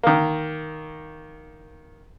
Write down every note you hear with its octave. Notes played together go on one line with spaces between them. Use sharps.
D#3 A#3